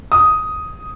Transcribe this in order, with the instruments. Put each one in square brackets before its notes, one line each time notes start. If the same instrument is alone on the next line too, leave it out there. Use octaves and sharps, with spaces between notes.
[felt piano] D#6